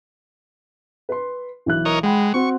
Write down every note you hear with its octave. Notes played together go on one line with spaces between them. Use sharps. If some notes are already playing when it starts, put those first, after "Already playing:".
B4 C6
B1 E3 F#6
A#4 C#5 D#5
G#3 F#5 G5 B5
C4 F#4 C#6